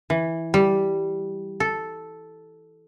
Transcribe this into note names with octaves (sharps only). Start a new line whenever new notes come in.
E3
G3
A4